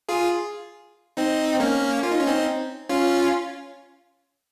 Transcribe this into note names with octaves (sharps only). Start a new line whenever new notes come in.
F4 G#4
C4 D#4
A#3 C#4
F4
D#4
C#4
C4 D#4
C#4 F4